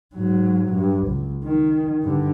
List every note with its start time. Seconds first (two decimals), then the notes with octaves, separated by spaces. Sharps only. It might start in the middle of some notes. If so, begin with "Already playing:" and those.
0.15 G#2 F#3
0.72 G2
1.07 C#2
1.44 D#3
2.03 G2 D3